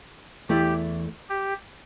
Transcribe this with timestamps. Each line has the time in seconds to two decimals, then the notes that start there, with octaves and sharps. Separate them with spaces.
0.49 E2 E3 A3 E4 G4
1.29 G4